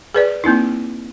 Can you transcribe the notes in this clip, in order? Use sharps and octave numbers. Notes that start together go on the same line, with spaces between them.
G#4 B4 D5
A#3 C4 D#4 E4